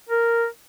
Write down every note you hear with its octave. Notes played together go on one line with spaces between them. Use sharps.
A#4